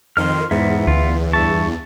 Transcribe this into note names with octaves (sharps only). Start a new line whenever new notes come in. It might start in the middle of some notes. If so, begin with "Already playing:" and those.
F2 D#3 C6 F6
E2 G#2 B3 E5
D2 F4
G2 E5 A5 C#6